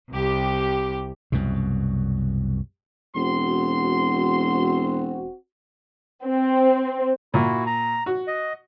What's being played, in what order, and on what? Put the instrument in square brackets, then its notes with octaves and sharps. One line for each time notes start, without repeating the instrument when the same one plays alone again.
[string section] C2 G4
[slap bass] C2 F#2 B2
[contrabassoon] E1 [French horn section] C4 F#4 [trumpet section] C6
[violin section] C4
[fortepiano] A#2 [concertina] E4 F#4
[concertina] A#5
[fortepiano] F#4
[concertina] D#5